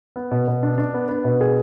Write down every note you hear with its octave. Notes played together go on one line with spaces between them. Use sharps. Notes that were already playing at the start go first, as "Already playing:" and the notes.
B3
B2
B2
D4
D4
B3
B3
B2
G#4